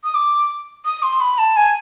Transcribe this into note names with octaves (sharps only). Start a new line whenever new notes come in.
D#6
D6
D#6
C6
B5
A5
G#5